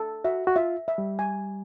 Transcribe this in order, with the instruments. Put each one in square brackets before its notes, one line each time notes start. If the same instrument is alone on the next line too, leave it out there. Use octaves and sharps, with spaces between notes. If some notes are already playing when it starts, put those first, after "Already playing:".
Already playing: [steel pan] A4
[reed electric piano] F#4 [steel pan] E5
[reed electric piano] F#4
[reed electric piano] F4 [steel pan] E5
[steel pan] E5
[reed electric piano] G3
[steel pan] G#5